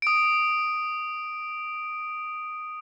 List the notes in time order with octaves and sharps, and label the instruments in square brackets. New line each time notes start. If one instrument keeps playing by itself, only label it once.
[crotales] D#6 D7